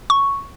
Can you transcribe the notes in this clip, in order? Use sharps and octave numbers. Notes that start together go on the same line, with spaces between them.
C#6